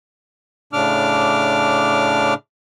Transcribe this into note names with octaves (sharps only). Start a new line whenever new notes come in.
A2 C#3 D4 D6 F6